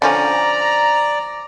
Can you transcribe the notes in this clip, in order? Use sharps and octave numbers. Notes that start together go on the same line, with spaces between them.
D3 F3 C#4 D5 A#5